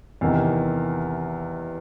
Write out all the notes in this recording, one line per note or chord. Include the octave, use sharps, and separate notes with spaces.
E2 C3 D#3